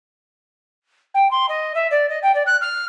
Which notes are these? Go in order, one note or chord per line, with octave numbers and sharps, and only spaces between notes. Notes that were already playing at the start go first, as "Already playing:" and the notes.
G5
C6
D#5
E5
D5
D#5
G5
D5
F#6
F6